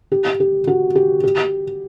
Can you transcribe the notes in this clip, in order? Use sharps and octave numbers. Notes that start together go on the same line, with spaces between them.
G4
G4
F#4
G4
G4